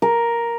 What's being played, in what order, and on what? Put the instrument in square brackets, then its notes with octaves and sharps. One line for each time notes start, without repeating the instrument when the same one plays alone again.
[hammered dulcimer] A#4